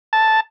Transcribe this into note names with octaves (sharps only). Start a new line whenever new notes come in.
A5